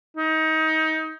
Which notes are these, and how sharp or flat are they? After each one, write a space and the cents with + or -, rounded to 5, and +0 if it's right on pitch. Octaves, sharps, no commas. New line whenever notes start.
D#4 +25